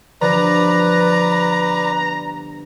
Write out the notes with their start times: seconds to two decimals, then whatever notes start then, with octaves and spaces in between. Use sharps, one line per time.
0.21 G1 F3 B4 D5 A#5